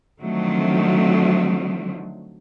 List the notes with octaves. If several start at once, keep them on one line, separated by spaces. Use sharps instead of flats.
D3 D#3 F3 F#3 A3 C4